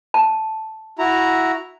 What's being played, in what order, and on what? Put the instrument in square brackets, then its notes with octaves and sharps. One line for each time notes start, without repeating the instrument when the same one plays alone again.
[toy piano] A5
[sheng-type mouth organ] E4 F#4 A#5